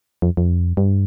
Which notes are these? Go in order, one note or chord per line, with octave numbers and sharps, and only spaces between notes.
F2
F2
G2